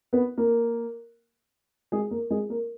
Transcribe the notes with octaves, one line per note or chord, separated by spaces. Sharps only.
B3 B4
A#3 A#4
G#3 G#4
A#3 A#4
G#3 G#4
A#3 A#4